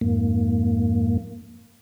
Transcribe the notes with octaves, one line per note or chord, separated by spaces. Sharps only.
F2 G#2 A#3